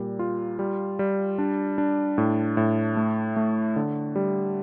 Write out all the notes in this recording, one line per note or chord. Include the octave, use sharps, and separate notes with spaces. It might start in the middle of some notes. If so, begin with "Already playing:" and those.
Already playing: A#2 G3
F4
G3
G3
D4
D4
A2
A2
A3
A3
D3
G3